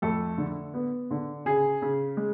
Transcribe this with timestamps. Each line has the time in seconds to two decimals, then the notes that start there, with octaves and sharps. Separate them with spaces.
0.02 F2 A3 A4
0.38 D3
0.74 B3
1.11 D3
1.45 C#3 G#4
1.82 C#3
2.17 G#3